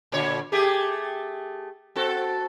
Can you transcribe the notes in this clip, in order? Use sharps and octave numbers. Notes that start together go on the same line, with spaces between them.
A#2 D3 C#5
A3 G4 G#4
C4 F#4 A4